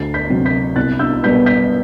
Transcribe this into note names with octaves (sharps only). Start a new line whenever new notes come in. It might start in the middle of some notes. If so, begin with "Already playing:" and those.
Already playing: D2 A6 C7
G6 B6
C3 F#3 C4
G6 B6
C2 F#6 A6
E6 G6
B2 G3 B3 G6 B6
G6 B6